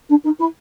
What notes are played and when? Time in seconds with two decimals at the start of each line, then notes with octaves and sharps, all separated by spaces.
0.09 D4
0.24 D#4
0.39 E4